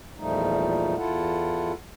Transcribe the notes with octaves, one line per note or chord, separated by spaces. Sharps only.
E2 A#2 F3 G3 A3 D#4
E2 E4 F4 A4 F#5